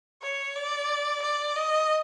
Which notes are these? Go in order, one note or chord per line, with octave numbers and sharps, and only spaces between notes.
C#5
D5
D5
D#5